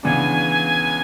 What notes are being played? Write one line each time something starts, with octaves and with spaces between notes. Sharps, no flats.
C#2 C#3 E3 B3 D4 G#5